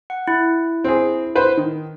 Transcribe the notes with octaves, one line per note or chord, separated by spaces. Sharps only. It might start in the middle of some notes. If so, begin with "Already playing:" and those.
F#5
E4
C4 G#4
B4 C5
D#3